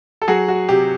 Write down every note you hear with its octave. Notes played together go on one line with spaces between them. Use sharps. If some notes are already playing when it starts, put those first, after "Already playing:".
A4
F#3 F#4 G#4
F#4
C3 G4